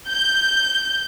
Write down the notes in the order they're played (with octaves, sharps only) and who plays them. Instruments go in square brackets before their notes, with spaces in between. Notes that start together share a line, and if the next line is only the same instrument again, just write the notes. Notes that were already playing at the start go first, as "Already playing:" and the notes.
[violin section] G6